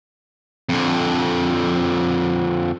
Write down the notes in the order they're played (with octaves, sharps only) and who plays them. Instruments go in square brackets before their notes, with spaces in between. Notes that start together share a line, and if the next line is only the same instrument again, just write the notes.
[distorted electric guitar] F2 D3